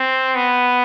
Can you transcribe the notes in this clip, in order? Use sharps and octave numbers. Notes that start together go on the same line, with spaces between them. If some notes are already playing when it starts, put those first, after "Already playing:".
Already playing: C4
B3